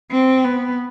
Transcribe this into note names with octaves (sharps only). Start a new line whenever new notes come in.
C4
B3